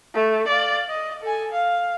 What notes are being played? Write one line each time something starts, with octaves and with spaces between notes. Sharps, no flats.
A3
D5 F5
D#5
A4 G#5
F5